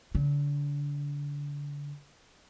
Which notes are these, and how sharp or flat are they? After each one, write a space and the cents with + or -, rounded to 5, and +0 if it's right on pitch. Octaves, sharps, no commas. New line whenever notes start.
D3 -30